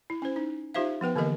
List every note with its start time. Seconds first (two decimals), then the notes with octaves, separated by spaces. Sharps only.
0.10 E4
0.22 C#4 E4 C5
0.36 D#4
0.74 D#4 F4 G4 C5 E5 F5
1.01 F3 B3 B4 G5
1.16 D3 E3 A#3 G4 A#4 D#5